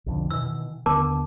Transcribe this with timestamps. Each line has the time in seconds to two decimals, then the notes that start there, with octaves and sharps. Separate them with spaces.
0.06 B1 F2 D3
0.31 B2 D#3 E3 E6
0.86 D#2 D3 B3 A#4 A5 D6